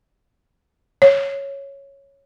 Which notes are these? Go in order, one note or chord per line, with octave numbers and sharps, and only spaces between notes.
C#5